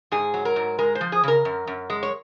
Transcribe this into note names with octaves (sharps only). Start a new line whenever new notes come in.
G#2 G#4
F#3
A#4
G#2
G#3 A#4
C5
F3
G#4
C#3 A#4
F#2
F#2
G#3
C#5